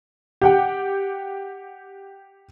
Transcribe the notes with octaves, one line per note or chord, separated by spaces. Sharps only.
G4 F#5 G5